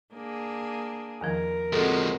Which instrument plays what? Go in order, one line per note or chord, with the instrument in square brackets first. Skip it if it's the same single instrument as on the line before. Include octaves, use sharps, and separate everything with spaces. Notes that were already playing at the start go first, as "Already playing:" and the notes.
[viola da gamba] A#3 D4 G#4
[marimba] E2 D#3 F3 [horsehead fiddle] A#4
[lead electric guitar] F3 G#3 [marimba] C4 A4 [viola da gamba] F#4